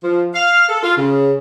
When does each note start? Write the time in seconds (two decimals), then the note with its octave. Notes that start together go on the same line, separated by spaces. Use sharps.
0.04 F3
0.34 F5
0.69 A4
0.83 F4
0.97 C#3